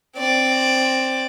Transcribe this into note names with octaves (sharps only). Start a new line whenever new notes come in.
C4 D5